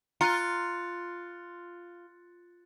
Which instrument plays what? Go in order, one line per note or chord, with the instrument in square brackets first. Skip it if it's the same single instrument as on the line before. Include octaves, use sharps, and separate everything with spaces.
[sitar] F4 [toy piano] A#5 [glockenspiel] F#6 A6 C#7